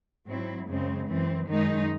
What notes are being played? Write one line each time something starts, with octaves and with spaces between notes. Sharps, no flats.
G#2 F#3 C4 E4
F#2 C#3 G#3 C4
F#2 E3 C4
F#2 D#3 G#3 D#4